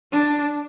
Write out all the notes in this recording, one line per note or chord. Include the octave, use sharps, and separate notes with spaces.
D4